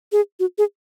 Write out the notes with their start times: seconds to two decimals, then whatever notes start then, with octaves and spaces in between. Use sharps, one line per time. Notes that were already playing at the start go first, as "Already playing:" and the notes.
0.12 G#4
0.40 F#4
0.58 G#4